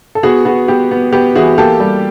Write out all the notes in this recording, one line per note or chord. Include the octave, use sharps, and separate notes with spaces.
A4
B3 F#4 G#4
B3 F#4
B3 G4
B3
B3 G4
E3 F#4 G#4
A#3 G4 A4
G3